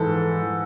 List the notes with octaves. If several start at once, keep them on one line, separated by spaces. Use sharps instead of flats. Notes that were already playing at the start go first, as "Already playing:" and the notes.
Already playing: G#2 E3 A4
E3